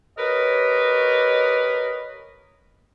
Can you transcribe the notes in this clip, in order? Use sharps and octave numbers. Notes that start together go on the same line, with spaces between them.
G4 A#4 B4 C#5 D#5